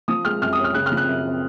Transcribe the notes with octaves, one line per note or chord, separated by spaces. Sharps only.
F3 D#6
G#3 F6
F#2 F6
D#6
C#4
F6
C#3 F#6
F6
F3
F#6
F#2
C4